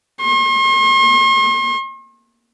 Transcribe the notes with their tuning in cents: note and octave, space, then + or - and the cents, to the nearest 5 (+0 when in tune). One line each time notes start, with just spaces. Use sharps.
C6 +45